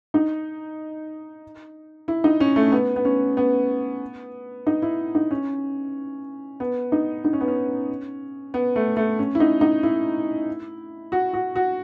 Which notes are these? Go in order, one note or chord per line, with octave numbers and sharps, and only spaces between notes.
D#4
E4
D#4
C#4
A3
B3
B3
C#4
B3
D#4
E4
D#4
C#4
B3
D#4
D#4
C#4
B3
C#4
B3
A3
A3
C#4
E4
D#4
D#4
E4
F#4
F#4
F#4